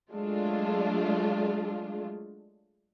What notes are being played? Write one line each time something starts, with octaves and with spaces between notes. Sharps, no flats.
F#3 G#3 A3 D4 F4